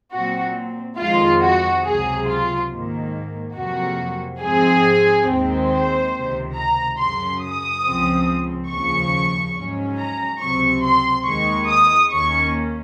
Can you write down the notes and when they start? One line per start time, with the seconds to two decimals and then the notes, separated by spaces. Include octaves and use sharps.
0.13 A#2 F#3 C4 F#4
0.99 F2 D#3 G#3 F4
1.42 F#4
1.85 C#2 C3 F#3 G#4
2.27 F4
2.70 G#2 D#3 A#3
3.56 F2 C3 F#3 A#3 F#4
4.42 G#2 F3 C4 G#4
5.27 D#2 D#3 G#3 C4
5.70 C5
6.13 C#2 C3 D#3
6.55 A#5
6.98 F#2 C#3 F#3 C6
7.41 D#6
7.84 C#2 C#3 F3 C4
8.70 D#2 C#3 F3 C#6
9.55 G#2 F#3 C#4
9.98 A#5
10.40 C#2 C3 F#3 C4 C#6
10.83 C6
11.26 D#2 D#3 G#3 C#6
11.69 D#6
12.12 D#2 D#3 A#3 C#4 C#6